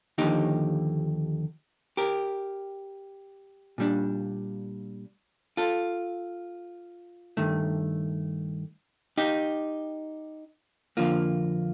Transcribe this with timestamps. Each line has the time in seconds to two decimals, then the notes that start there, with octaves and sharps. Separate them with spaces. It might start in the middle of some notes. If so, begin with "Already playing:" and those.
0.18 D#2 D3 F3 D#4 G4
1.97 G4 A#4
3.78 A#2 G3 D4
5.57 F4 A4
7.37 G2 D#3 A3
9.18 D#4 G4
10.97 F2 D3 F3 A#3 F4